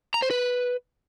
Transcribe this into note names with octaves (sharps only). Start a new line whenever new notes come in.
A#5
C5
B4